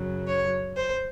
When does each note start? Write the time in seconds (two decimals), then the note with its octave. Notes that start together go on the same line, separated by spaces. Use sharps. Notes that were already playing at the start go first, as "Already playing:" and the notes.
Already playing: F#2 C#3 F#3
0.27 C#5
0.77 C5